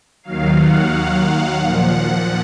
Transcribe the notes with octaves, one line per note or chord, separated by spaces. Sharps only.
D#2 D#3 F#3 F5
F#5
F#5
A#2 F3